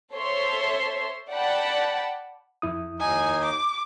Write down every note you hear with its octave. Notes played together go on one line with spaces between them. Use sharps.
A4 C5 C#5 E5 C6
D5 F#5 G5 A5 B5
F2 E4 D#6
D#2 D#4 G#5
D6